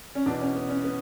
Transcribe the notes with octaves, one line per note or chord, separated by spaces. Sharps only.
C#4
E2 B2 D4
C#4
B3
C#4
B3